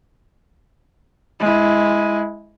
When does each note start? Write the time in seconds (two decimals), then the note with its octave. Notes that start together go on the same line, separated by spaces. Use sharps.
1.40 G#3 E4